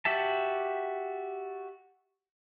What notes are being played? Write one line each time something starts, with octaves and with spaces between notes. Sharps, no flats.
F#4 G4 E5 A5